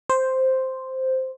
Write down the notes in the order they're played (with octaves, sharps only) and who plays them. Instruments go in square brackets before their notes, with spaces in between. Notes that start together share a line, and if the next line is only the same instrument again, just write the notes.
[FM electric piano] C5